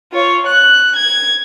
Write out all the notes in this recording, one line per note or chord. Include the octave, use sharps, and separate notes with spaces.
F4 C#5
F#6
G#6